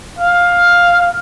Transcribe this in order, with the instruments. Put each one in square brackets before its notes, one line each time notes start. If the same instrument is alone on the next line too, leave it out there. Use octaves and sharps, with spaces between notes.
[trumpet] F5